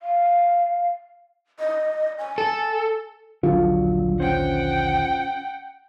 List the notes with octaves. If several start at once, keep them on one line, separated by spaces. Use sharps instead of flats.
F5
D#5
G#5
A4
A#1 D#2 D3 F#3 F4
C#4 C5 F#5 G5